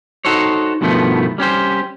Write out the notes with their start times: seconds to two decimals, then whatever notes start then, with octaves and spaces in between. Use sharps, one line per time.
0.25 D#4 F#4 A4 C5 C#5
0.81 G2 B2 D#3 F3 A3 B3
1.38 G3 C#4 G4 C5